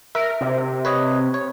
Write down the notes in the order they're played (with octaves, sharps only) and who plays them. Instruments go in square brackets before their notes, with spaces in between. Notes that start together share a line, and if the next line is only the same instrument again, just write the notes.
[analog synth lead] A#4 [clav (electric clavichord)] E5
[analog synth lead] C3
[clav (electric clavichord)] B4 C#5 D#5
C#5